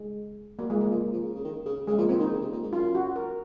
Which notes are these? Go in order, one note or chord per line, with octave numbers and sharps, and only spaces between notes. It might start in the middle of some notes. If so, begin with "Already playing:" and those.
Already playing: G#3
F#3 A#3
F3 G#3
F3 A#3
F3 A#3
F3
C#3
C#3
D#3
C#3
C#3 G#3
F3 A#3
F3 C4
D#3 D#4
C#3
C3
A#2
G#2
F#2 F4
F#4
A#4